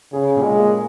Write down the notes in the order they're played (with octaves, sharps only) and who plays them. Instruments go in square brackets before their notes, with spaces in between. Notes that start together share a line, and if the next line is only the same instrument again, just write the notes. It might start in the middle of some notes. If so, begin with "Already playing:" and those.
[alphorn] C#3 [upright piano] G#4
[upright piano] A#2
[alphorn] G#3
[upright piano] A#3